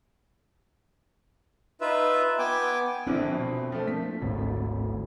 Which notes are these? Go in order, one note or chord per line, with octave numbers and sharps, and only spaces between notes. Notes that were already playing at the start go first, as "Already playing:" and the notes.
D#4 F4 B4 E5
B3 G5 G#5 D6
A#1 D3 C4 D4 E4
B2
F3 A3 D4
A#3 C4 B6
G#1 D2 A2